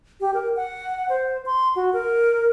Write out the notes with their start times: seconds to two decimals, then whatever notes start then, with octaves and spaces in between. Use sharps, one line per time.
0.20 G4
0.34 A#4
0.56 F#5
1.09 C5
1.46 C6
1.76 F#4
1.93 A#4